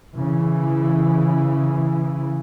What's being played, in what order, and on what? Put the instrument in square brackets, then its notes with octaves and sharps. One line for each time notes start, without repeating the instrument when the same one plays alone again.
[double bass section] C#3 E3